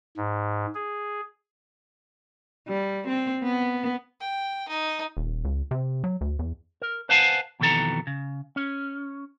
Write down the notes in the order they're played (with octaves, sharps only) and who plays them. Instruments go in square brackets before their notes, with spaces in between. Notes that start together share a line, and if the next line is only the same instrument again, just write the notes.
[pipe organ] G#2
G#4
[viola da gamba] G3
C4
B3
[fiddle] G5
D#4
[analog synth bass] D#1
C#2
C3
F#3
D2
E2
[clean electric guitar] A#4
B4 C5 F5 F#5 G#5 A5
F2 B2 D#3 E3 A4 A#5
C#3
C#4